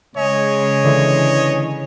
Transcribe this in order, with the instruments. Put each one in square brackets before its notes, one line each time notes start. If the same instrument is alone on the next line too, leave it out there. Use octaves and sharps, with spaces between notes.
[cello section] C#3 G#3 [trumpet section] C#5 D#5 G#5
[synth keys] D3 E3